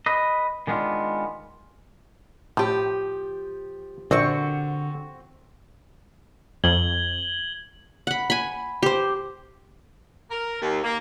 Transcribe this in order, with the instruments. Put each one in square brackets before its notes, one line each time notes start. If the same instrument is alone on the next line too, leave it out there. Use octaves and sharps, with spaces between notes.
[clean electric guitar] B4 D#5
D#3 G#3 B3 D4 F4
[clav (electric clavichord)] A2 [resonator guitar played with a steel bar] F3 G4
[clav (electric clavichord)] A#1 [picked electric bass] D3 [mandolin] C4 F#4 C#6
[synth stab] F2 [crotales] G#6 F#7 G7
[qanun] F#5 B5
G#5 B5
G4 C5
[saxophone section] A#4
D#2
A#3